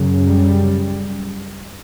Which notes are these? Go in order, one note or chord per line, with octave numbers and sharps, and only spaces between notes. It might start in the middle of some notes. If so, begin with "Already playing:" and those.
Already playing: F#2 C#3
G3